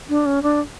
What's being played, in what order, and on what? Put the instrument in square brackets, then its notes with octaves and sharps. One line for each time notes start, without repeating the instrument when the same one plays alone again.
[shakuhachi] D4
C#4
D4